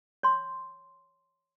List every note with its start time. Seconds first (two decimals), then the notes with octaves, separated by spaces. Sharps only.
0.23 C#5 C6